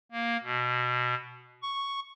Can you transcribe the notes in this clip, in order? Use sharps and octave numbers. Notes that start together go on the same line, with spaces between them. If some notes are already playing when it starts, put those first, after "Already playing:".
A#3
B2
C#6